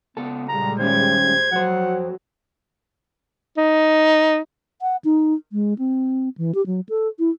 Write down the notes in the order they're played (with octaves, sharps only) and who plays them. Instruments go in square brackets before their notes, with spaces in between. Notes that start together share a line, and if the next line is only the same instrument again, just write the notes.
[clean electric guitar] C#2 A4 A5 [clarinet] B3
[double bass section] A#2 G3 G#3 [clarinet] A#5
[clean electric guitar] D#3 C#4 G4 [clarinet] C5 [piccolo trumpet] G#6
[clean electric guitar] F2 C5 [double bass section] F#3 [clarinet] F#5
[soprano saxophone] D#4
[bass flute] F#5
D#4
G#3
C4
E3
G4
F#3
A4
E4